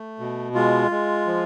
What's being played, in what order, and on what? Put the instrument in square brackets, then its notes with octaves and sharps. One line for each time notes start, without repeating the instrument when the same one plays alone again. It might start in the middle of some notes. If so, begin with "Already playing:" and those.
Already playing: [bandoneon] A3
B2
G#3 F4
G#3
F3